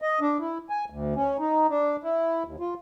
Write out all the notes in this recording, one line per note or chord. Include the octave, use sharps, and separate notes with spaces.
D#5
D4
E4
G#5
D2
C#4
D#4
D4
E4
D#2
F4